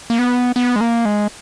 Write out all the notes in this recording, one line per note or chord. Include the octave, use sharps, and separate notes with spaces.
A#3
B3
B3
G#3
A#3
G#3